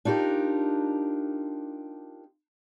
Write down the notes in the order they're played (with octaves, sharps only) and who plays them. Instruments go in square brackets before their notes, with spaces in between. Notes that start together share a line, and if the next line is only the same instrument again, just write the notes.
[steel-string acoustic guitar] D4 D#4 F4 G4 A#4